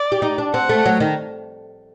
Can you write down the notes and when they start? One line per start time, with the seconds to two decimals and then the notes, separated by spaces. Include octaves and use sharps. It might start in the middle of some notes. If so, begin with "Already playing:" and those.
Already playing: D5
0.12 G4
0.22 D#4
0.38 D4
0.54 C4 F#5
0.69 A3
0.86 F#3
1.00 D#3